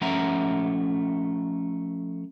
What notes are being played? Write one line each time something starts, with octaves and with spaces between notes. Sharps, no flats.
F3 A3 C#4 E5 F#5 A#5